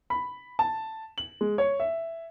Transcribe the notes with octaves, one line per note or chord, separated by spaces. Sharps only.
B5
A5
F#7
G#3
C#5
E5